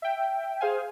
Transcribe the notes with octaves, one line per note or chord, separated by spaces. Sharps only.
E5 G5
G#4 C5 F5 G#5